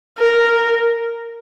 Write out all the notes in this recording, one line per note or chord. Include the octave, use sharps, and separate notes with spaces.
A#4